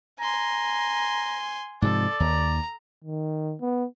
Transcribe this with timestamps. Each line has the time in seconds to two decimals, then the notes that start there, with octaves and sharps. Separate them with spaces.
0.20 G#5 A#5 C6
1.82 G#2 C3 F3 A4 D5
2.20 D#2 A#5
3.04 D#3
3.61 B3